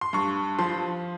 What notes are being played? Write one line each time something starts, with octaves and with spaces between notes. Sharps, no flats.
C6
G2 C#6
F3 C6